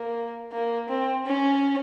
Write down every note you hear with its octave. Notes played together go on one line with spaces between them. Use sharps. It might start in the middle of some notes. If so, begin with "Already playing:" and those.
Already playing: A#3
A#3
C4
C#4